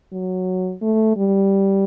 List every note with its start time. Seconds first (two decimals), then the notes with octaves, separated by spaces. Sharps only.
0.12 F#3
0.82 A3
1.17 G3